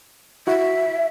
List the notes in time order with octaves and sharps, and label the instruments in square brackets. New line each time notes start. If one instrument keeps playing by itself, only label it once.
[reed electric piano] E4 F#4 [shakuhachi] E5